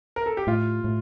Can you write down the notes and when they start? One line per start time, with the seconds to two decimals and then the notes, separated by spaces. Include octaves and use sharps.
0.16 A#4
0.26 A4
0.37 G4
0.47 A2 F4
0.84 A2